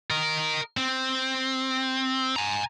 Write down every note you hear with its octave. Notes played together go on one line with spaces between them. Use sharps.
A#4 D#5
C4
G#5 A#5